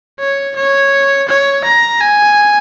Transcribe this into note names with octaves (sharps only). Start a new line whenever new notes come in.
C#5
C#5
C#5
A#5
G#5